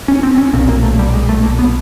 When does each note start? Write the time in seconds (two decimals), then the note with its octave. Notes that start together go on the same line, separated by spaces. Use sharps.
0.08 C#4
0.23 C4
0.38 C#4
0.53 B1 A#2 C4
0.69 A#3
0.83 A3
0.99 G3
1.14 G#3
1.29 A3
1.44 A#3
1.59 B3